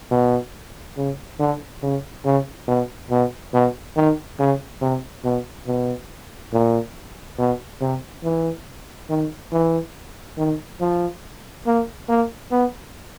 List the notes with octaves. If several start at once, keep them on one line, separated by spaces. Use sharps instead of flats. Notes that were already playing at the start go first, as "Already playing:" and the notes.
B2
C#3
D3
C#3
C#3
B2
B2
B2
D#3
C#3
C3
B2
B2
A#2
B2
C3
E3
D#3
E3
D#3
F3
A#3
A#3
B3